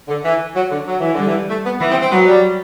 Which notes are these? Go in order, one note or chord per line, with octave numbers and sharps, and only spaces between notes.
D3
E3
F#3
D3
F#3
E3
D3 G3
E3
A3
B3
E3 B3
C4
C4
F#3 B3
G3